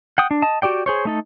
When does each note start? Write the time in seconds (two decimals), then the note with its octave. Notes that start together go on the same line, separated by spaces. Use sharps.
0.18 F#5 G5 D#6
0.31 D4
0.42 D#5 A5
0.62 F#4 G4 D5 G5
0.86 G#4 C5 C#5
1.05 A3 D#4 A4